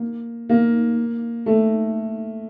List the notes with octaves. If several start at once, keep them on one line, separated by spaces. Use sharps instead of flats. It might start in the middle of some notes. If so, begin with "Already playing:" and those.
Already playing: A#3
A#3
A3